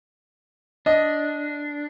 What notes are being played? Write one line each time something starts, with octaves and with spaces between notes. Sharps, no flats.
D4 D#5